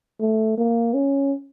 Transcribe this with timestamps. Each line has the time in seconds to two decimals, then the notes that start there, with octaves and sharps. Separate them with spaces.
0.20 A3
0.57 A#3
0.94 C#4